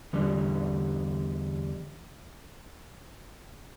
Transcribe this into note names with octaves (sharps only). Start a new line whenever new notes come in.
E2 D3 G3